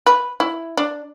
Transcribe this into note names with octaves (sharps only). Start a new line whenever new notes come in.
B4
E4
D4